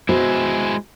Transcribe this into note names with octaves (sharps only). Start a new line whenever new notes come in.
G#3 B3 E4 F#4 C5